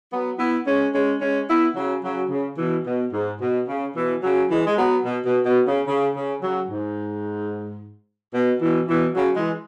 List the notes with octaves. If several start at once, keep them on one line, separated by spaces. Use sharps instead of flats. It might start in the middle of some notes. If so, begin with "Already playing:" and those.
F#3 B3
B3 E4
G#3 C#4
G#3 C#4
G#3 C#4
B3 E4
C#3 F#3
C#3 F#3
C#3
B2 E3
B2
G#2
B2
C#3
B2 E3
C#3 F#3
E3 G#3
G#3
F#3 B3
B2
B2
B2
C#3
C#3
C#3
C#3 F#3
G#2
B2
B2 E3
B2 E3
C#3 F#3
E3 G#3